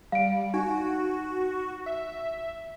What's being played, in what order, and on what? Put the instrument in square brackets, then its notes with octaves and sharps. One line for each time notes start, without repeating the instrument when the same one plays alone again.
[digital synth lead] G3 [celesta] F5 D7
[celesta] D#4 [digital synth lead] F#4
[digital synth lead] E5